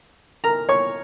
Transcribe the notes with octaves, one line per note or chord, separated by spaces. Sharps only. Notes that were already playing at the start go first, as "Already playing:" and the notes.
A#4 A#5
C#5 C#6